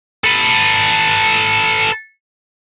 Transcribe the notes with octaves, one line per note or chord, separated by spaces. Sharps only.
A4 B4